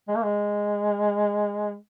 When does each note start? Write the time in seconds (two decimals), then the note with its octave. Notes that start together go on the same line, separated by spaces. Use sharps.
0.08 G#3
0.16 A#3
0.23 G#3